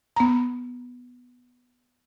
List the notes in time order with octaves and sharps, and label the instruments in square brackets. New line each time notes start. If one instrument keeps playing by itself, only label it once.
[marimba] B3 A#5